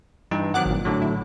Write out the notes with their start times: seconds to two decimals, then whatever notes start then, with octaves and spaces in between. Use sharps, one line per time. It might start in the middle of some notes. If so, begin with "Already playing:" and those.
0.31 G2 E3 D#4
0.54 D#3 F#3 C4 F#5 D6 F#6
0.66 G#1 A#2
0.85 A2 D3 F#3
1.02 E4